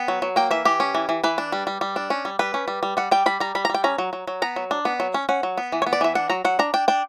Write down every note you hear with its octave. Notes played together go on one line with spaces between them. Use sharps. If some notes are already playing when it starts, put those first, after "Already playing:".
Already playing: B3 G5
F#3
F#3
A#3 G5
E3 E5
E3 G4
C#4
E3
E3
E3 B4
D4
G3
G3
G3
D4
C#4
G3
G3 B4
C#4
G3
G3
G3 F#5
G3 G5
G3 B5
G3 A#5
G3 B5
A#5
G3 G5
C#4 A#5
F#3
F#3
F#3
B3 A#5
F#3
D4
B3
F#3
C#4
C#4 F#5
F#3
B3
E3
C#5
B3
D5
E3 E5
D4 F#5
F#3 A#5
F#3 F#5
D4 A#5
D4 G5
D4 G5